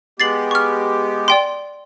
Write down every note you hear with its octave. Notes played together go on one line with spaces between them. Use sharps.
G#3 B3 G4 A6 C7 F#7
C#6 F6
D5 G5 C6